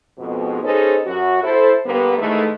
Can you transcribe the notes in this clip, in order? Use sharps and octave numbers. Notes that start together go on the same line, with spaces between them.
F2 G#2 B2
C#4 D#4 G#4 A4 B4 C5
F#2 F#4
E4 A4 C5
D3 G3 A#3 B3
G#2 D#3 E3 G#3 A3